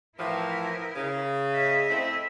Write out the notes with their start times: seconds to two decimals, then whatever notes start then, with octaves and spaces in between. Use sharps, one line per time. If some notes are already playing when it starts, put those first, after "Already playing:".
0.17 A2 E3 F3 E4 A#4
0.95 C#3
1.53 D#5 E5
1.90 A3 C4 E4